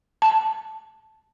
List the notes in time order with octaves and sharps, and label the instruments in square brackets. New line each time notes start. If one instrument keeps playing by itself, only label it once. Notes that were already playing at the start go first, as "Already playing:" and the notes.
[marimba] A5